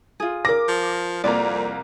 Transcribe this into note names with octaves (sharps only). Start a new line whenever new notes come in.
F4 G#4
A#4 D6 A#6
F3
C2 F2 A#3 D5 A#5